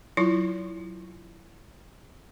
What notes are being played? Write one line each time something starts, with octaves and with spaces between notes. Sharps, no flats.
F#3 E4 F4 C#6